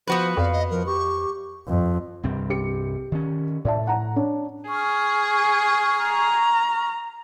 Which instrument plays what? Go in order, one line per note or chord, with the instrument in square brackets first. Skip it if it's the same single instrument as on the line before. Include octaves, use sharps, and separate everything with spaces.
[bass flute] F3 [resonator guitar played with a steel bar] B3 F#4 B4 [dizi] C5
[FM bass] F2 [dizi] D5 [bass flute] F5
[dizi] D#5
[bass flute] F3 [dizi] A#4
[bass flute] G4 [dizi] C#6
[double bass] F2
[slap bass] C2 G2 C4
[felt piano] G4 C#7
[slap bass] D#3 C#4
[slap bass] A2 [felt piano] D5 E5 A5
[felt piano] F#5 A#5
D4 C#5
[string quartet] G#4 [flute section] C#6 F6
[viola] A#5